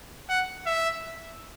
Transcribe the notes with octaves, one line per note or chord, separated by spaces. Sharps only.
F#5
E5